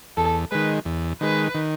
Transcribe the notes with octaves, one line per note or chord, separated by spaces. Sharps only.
E2 A4
D#3 G#3 B4
E2
D#3 G#3 B4
D#3